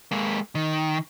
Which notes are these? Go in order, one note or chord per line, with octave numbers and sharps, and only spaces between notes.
G#3 A#3
D#3